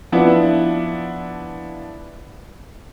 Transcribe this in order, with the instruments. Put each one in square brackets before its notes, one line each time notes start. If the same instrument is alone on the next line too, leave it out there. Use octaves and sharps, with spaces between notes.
[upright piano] F3 B3 D4 E4